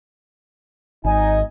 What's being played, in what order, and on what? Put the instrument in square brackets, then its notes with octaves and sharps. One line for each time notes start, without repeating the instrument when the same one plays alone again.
[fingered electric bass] G#1 [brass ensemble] D#4 D#5 G#5